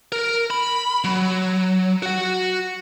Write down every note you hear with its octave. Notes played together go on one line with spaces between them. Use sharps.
A#4
B5
F#3
F#4 F#5